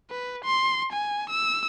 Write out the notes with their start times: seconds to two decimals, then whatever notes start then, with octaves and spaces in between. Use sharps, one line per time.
0.11 B4
0.45 C6
0.92 G#5
1.30 E6